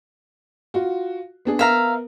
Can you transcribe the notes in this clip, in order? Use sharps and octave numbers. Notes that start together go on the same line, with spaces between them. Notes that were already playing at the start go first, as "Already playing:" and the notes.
F4 F#4
B3 D4 G#4
B3 A#4 E5 F5 A#5